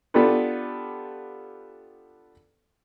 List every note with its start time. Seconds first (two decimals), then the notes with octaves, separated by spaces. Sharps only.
0.14 B3 D4 F4 G4 A4 B4